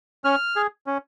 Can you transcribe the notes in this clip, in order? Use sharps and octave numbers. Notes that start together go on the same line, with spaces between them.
C#4 F6
G#4
C#4